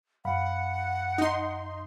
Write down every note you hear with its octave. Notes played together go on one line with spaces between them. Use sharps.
F#2 F5 F#5 B5
D#4 C6